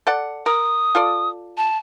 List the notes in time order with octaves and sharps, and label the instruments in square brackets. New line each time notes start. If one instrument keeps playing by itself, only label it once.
[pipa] A4 D5 F#5
[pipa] A#4 [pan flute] D#6
[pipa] F4 A4 D5
[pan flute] A5